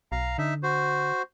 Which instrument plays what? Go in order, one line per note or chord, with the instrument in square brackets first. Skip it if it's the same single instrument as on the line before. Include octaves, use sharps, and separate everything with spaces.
[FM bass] B1 [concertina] F5 A#5
[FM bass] D3 [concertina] D#4 E5
[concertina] F#4 C5